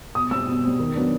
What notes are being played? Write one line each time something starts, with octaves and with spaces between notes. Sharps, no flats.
B2 D#6
G3 C4 E6
B2
G3 C4
D#3
F#3 B3 D4